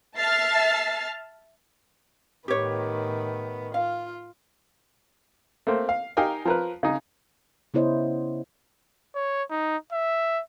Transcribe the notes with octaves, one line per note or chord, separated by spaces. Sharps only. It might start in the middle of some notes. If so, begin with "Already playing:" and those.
E5 A5 F6 A6 C7
A2 D#3 B3 G4 C#5
F4 F5
A3 A#3 C4
F5
D#4 G4 A#4 F5 G5 G#5
F3 A#4 B4
C#3 D#4
C#3 B3 E4 C5 C#5 D#5
C#5
D#4
E5